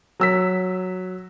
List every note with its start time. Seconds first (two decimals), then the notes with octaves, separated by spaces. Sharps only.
0.20 F#3 E6 B6